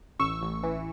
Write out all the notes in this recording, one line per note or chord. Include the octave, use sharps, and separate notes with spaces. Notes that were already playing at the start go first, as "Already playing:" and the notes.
A1 C#6 E6
A1
E3